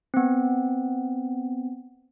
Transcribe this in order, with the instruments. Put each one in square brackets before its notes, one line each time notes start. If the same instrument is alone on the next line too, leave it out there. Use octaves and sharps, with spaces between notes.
[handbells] B3 C4